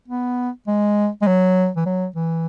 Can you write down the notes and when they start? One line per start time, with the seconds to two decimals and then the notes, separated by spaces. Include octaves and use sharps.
0.08 B3
0.67 G#3
1.22 G#3
1.27 F#3
1.77 E3
1.86 F#3
2.16 E3